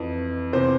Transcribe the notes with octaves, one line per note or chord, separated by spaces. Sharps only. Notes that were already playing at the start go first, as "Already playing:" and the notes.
Already playing: F2 E3
E2 C3 E3 C5